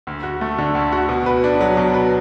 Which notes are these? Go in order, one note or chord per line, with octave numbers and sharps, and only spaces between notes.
D2
F#4
A3
D3
D2
F#4
B2
B4
D4
F#3
B2
B4